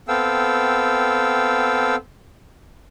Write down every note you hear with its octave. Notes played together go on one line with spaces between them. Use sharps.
B3 C4 A4 F5 G5 E6